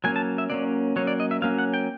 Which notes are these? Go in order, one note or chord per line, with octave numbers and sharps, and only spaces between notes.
F#3 A#3 C#4 G#5
A5
E5
F#3 A#3 C#4 D5
F#3 A#3 C#4 C#5
D5
D#5
E5
F#3 A#3 C#4 F5
F#5
G5